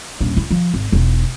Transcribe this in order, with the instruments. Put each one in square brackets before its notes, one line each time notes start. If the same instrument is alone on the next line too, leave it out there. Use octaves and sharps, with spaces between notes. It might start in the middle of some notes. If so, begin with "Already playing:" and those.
[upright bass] D#1 D4
E4
F3
G#1
E1 D#4